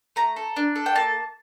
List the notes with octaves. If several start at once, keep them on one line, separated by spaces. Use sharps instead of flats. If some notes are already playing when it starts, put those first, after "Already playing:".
A3 A#5
A4
D4
A4
G5
A#3 A5